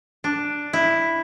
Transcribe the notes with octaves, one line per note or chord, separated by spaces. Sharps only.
D4
E4